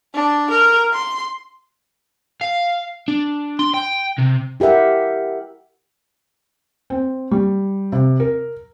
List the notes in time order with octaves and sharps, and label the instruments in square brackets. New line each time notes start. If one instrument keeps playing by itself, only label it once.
[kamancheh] D4
A#4
C6
[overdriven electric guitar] F5
D4
C6
G5
C3
[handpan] E4 G4 A#4 E5 F#5
[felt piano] C4
G3
C3
A#4